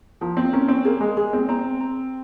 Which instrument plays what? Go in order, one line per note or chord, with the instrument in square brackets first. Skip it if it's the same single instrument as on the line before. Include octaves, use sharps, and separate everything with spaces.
[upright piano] F3 [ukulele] A#4
[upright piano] C4
[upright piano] C#4 [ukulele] A#4
[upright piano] C4
[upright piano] A#3 [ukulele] G#4
[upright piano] G#3
[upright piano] G#3 [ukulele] G#4
[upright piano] C4
[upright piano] C4 [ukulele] A#5
[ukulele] A#5